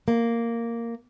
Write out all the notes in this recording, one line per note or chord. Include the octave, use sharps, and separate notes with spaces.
A#3